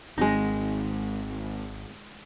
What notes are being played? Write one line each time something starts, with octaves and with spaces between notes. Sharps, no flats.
G#1 G#3 C4 D#4